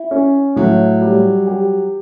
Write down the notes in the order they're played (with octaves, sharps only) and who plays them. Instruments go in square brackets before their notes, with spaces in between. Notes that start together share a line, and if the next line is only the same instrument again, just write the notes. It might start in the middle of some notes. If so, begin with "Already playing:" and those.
Already playing: [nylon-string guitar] E4
[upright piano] C#4
[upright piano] A2 [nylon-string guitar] F#3
[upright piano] G3
G4